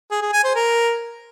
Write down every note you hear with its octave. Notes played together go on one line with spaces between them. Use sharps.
G#4
G#4
G#5
C5
A#4